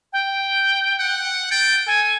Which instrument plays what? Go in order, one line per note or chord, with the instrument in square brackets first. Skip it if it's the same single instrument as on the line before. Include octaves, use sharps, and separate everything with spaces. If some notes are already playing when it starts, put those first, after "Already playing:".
[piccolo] G5
[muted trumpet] F#5
[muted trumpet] G5 [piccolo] A6
[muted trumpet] A4 [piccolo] G#5